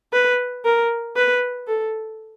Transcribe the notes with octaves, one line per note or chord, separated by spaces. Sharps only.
B4
A#4
B4
A4